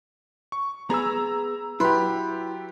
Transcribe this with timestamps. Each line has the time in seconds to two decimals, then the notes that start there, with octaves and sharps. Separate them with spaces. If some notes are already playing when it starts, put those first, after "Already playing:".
0.52 C#6
0.90 B3 G#4 B4 A#5 E6
1.80 F#3 E4 G4 B4 C6